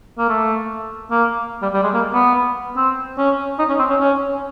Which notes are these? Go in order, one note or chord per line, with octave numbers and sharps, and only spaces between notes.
A#3
A3
A#3
G3
G3
G#3
A#3
B3
C4
C#4
D#4
C#4
C4
C#4
C#4